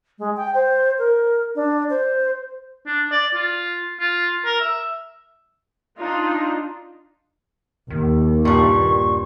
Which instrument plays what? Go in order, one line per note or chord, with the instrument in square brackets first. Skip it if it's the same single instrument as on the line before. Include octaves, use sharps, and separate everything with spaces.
[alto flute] G#3
G5
C5
A#4
D4
C5
[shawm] D4
D5
F4
F4
A#4
E5
[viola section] D4 D#4 F4
[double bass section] D#2 [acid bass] D#3
[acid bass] G2 [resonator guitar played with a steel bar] A#2 G3 [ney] C#6